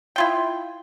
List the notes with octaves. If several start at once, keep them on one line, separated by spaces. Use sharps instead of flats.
E4 F4 G5